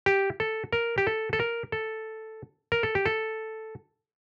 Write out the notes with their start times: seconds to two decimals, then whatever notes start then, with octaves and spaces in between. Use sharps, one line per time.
0.06 G4
0.40 A4
0.73 A#4
0.98 G4
1.07 A4
1.33 A4
1.40 A#4
1.72 A4
2.72 A#4
2.83 A4
2.95 G4
3.06 A4